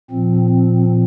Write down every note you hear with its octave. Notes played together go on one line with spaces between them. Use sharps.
A#2 F3 C4
C4